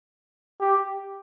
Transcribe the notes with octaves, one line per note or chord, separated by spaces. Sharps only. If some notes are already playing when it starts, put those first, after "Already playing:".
G4